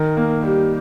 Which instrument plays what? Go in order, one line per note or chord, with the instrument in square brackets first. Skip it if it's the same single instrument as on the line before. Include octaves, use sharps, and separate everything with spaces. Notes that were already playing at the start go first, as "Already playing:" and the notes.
Already playing: [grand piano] D#3 [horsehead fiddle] A#4
[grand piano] A#3
[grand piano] G3 [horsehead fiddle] G4